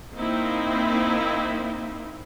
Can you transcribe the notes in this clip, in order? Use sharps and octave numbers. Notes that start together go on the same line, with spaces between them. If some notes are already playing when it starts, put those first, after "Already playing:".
A#3 C4 D#4 E4